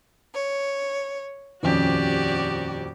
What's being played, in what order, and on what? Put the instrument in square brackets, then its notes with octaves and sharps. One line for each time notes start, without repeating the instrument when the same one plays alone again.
[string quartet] C#5
[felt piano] D#1 F2 C#4 [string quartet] F#4 G4 D5